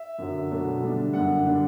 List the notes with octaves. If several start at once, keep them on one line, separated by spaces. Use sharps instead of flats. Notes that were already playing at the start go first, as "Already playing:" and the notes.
Already playing: E5
F#2 D3 F#3
B2 F#3 A3 D4
D3 G3 D4
F#2 D3 G3 D4 F#5
D3 G3 D4